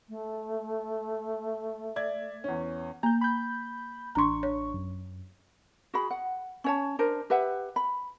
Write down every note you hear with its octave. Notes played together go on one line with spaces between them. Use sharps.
A3
D5 E5 G#6
E2 C#4
A#3 A#5 G6
B5 G6
A1 D4 A#5 C6 C#6
C#5
F#2
F#4 G#4 B5
F#5
C#4 C#5 A5
D4 A#4 C5
G4 B4 E5 F#5
B5